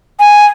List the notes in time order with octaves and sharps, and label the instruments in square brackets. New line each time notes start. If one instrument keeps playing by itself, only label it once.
[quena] G#5